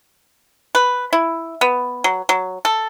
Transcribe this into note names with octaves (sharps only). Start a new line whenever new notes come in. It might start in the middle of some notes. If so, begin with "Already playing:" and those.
B4
E4
B3
F#3
F#3
A4